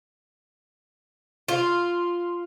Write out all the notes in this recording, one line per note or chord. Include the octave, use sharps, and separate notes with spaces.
F4